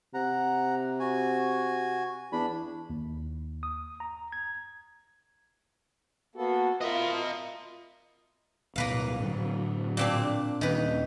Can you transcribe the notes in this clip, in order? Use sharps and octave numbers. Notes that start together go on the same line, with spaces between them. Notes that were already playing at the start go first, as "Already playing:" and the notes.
C3 F#5 A#5
F#4 G#5
E2 D4 B5
D#2
D#6
A#5
G#6
A#3 B3 F#4 A4
F4 A#4 D#5 E5 B5
D1 B2 A#3 B4 F5
A2 D3 F#3
A#2 C4 D4
D#1 D#3 B4